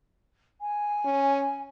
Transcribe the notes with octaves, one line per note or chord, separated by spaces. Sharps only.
G#5
C#4